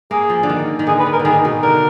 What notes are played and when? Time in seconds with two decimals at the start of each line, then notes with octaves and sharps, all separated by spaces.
0.11 A#3 G#4
0.30 F3
0.43 D3
0.49 D#3
0.79 D#3
0.87 D3 G#4
0.99 B4
1.06 D#3
1.12 A#4
1.19 D3
1.25 D#3 G#4
1.45 B2
1.62 D3 A#4